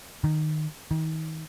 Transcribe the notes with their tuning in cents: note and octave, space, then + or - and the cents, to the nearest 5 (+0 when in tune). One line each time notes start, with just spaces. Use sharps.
D#3 -15
D#3 +35